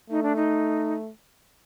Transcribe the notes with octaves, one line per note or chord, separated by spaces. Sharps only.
A3 D#4
D4
D#4